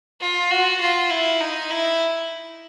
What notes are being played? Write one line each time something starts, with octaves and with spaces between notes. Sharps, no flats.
F4
F#4
F4
E4
D#4
E4